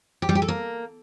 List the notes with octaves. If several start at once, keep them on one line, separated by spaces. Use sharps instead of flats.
G4
G3
G4
A4
A#3